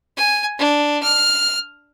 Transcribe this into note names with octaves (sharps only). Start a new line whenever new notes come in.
G#5
D4
F6